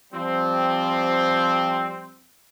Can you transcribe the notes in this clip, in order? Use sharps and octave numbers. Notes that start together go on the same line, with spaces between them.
F3 G3 C4